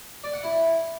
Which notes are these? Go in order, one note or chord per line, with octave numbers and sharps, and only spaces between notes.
D5
F#5
E4